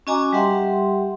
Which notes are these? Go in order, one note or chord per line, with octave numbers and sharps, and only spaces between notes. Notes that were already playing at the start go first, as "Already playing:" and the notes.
C#4 F#4 D#5 G#5 A#5 D6
G3 G4 E5 F#5 C6